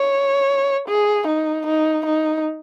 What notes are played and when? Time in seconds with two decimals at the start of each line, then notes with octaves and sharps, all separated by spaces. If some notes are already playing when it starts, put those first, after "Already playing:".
Already playing: C#5
0.88 G#4
1.27 D#4
1.66 D#4
2.06 D#4